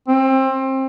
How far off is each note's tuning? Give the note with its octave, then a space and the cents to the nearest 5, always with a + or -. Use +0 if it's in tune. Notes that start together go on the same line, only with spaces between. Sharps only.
C4 +25